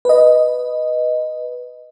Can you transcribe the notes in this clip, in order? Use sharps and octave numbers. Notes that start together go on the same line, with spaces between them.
B4 D#5